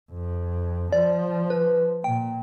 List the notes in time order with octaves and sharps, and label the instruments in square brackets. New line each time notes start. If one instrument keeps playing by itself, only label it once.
[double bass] F2
[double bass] F3 [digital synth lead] D5
[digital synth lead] B4
[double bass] A#2 [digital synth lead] G5